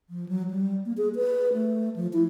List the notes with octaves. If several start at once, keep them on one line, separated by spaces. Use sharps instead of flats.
F3
F#3
G3
A#3
G#4
B4
A3
F3
E4